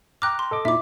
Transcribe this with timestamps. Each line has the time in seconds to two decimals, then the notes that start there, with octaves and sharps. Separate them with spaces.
0.22 G5 A#5 D6 F6 F#6
0.39 C6
0.51 A4 D#5 D6
0.65 A#2 D#4 E4 E5 D6